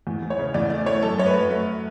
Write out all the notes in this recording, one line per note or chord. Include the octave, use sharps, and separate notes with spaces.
E2
E2
C#5
C#3
E2 D5
A3 D5
A3 C#5
F#2 A4
F#2 C#5
B4
F#2
A3